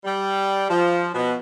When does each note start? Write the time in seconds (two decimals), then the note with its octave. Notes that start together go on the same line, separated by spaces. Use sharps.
0.04 G3
0.70 F3
1.14 B2